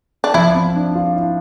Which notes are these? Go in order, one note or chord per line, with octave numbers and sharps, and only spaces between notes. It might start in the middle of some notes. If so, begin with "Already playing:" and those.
D4
F3 E4
C4
D4
F4
E4